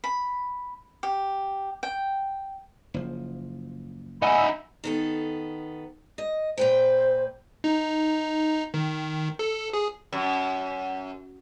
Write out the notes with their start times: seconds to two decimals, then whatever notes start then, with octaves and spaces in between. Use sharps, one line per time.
0.04 B5
1.03 G4
1.83 G5
2.94 F#1 F3
4.22 D#4 E5 F#5 G#5 B5 E6
4.84 D#3 B3 A4
6.18 D#5
6.58 A#2 B4 C5 G5
7.64 D#4
8.74 D#3
9.39 A4
9.73 G#4
10.13 F#2